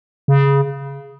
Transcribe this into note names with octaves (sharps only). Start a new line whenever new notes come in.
C#3